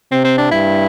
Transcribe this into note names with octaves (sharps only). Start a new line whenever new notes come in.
C3 C4
C4
D4
G2 E4